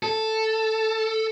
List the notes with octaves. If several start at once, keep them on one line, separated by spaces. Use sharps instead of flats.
A4